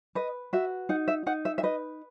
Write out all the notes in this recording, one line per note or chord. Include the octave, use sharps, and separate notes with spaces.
B4 D#5
F#4 E5
D#4 F#5
E5
D#4 F#5
E5
E5
B4 D#5